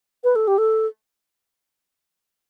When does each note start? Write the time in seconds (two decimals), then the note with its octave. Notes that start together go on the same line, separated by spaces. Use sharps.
0.24 B4
0.35 A4
0.47 G4
0.58 A4